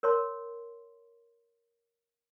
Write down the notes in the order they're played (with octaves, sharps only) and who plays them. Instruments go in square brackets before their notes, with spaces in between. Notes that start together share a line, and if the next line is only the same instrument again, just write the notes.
[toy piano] A#4 C#5 A5 C6